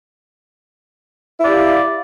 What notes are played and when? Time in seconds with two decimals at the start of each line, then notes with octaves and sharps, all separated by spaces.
1.39 E4
1.43 D5
1.46 G4
1.50 F5